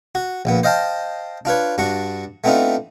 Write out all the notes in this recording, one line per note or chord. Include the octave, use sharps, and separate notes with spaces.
F#4
A#1 A#2 B3
C5 D#5 F5 G5 A5
D4 F4 B4 C#5
G2 D4 F#4 C#6
A3 B3 C4 D4 D#4 F4